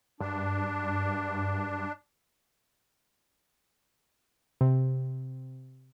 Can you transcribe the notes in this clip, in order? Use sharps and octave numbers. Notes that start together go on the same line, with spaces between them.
G2 D4
C3